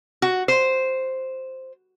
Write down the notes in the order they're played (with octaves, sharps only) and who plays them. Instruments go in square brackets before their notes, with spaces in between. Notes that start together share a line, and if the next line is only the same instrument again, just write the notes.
[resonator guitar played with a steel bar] F#4
C5